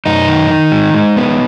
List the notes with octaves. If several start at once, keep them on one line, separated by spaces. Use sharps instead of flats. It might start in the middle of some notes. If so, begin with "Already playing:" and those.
F#2 D#4
D#3
D#3
G#3
G#3
B3